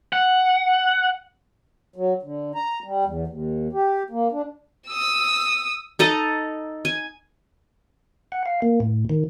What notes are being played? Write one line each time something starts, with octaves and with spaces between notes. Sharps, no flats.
F#5
F#3
D3
A#5
G3
E2
D#2
G4
A#3
D4
D#6 E6
D#4 A4 D#5 A#5
G#5
F#5
F5
A#3
A2
D#3